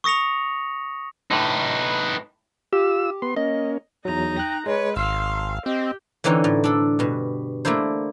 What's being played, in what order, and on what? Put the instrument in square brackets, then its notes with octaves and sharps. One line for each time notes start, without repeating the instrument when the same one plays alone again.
[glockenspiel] C#6 D#6 A#6 C#7 F7
[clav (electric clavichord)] A2 D3 [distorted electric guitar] D#4 B4
[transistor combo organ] F4 E6 [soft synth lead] G4
[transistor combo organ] B3 C6
[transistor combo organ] A#3 C#4 [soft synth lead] D#5
[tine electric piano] E2 F#3 [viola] D#4 A#5
[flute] G5 [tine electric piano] F#6 A#6
[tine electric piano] G#3 [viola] B4 [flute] C#5
[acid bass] G#1 [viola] F5 [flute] C6 [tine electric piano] E6 F6
[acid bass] C4 [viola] G4 [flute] D#5
[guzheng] D3 E3 C4 C#4 D#4
A2
D4 A4
G2 B2
A3 A#3 D4 E4 C5